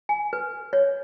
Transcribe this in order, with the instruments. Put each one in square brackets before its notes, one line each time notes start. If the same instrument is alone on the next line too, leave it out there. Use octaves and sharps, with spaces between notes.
[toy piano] G#5
B4
C#5